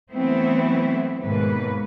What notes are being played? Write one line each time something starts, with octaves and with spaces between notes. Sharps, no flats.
E3 F#3 A3 B3 C4 E4
D#2 G#2 B2 A#3 B4